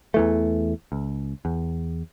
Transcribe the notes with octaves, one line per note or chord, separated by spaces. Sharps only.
E2 E3 A3
C#2
E2